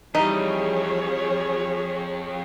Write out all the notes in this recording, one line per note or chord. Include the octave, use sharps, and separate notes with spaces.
F2 E3 F3 G3 D#4 G#4 C#5